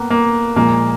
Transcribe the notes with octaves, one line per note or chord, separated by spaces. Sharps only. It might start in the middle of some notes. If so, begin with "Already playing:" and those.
Already playing: A2 A#3 B3
A#3
A#2 F3 G#3 A#3